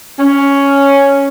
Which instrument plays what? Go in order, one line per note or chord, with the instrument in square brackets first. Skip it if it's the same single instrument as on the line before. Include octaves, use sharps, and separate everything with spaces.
[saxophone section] C#4